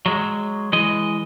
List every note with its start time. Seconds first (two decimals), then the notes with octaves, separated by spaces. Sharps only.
0.06 F#3 G#3
0.73 E3 G#3 D#5